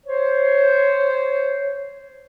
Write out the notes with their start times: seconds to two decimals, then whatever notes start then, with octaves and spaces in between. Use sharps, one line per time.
0.06 C5 C#5